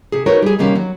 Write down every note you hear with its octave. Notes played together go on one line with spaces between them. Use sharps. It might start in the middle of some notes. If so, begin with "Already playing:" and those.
C3 G#4
D#4 F#4 A#4 B4 C#5
G3 G#4
C3 D#3 G3 A#3 C#4
F#3